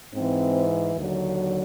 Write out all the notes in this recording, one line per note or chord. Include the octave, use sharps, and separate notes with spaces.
G#2 E3 C4
D#2 D3 F#3